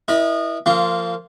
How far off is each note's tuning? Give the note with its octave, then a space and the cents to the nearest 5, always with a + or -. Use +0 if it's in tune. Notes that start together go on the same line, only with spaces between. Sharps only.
E4 +0 A#4 +45 D#5 -25
F3 +0 A#3 -25 F4 -5